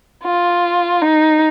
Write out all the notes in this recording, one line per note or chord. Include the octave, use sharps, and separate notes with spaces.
F4
D#4